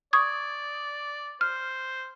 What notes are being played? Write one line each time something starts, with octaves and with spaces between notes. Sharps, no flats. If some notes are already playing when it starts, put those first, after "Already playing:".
D5 C#6 D#6 G#6
C5 F6